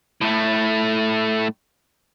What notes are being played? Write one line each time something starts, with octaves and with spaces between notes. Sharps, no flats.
A2 A3